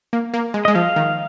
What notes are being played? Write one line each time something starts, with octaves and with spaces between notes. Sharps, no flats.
A#3
A#3
G#3
G#3 D#5
F3 F5
D#3